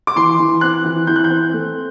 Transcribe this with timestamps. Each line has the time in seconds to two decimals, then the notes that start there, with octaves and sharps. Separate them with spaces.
0.07 D6
0.16 E3 C6
0.39 E3
0.61 C4 F#6
0.85 E3
1.07 E3 G6
1.16 F#6
1.24 G6
1.30 C4
1.53 A3